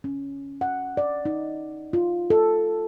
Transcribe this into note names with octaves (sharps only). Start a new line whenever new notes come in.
C#4
F#5
D5
D#4
F4
A4